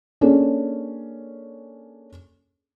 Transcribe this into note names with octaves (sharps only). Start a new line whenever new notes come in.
A#3 C#4 D4 G#4 A4